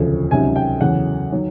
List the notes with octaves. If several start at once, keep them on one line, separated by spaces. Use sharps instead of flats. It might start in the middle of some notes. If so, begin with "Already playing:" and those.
Already playing: E1 D2 C#3 F3
C#2 C3 D#3 F#3 G#5
G5
E2 C#3 F#3 F#5
D#3 F#3